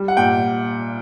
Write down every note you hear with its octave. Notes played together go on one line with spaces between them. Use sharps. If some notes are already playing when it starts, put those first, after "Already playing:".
Already playing: G3
F#5
A#2 G5